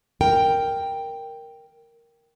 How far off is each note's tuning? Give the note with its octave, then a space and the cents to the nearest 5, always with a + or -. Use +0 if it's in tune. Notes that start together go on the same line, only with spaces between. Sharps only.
A#4 +0 G5 +0